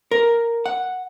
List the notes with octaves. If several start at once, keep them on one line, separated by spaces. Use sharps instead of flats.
A#4
F#5